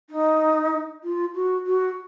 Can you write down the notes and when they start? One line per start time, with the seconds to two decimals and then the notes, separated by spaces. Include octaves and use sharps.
0.10 D#4
1.03 F4
1.35 F#4
1.66 F#4